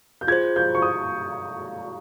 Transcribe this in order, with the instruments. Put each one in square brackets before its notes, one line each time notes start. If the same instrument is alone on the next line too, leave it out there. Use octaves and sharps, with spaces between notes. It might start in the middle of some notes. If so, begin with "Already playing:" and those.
[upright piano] G6
[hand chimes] F4 G#4 C5 [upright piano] G#6
[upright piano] G6
C#6
D#6